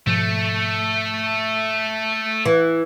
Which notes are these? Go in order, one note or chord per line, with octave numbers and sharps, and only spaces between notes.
G#2 B2 F3 A3
E3